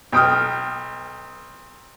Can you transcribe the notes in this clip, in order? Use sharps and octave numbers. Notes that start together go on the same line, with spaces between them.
B1 G5 D#6 F6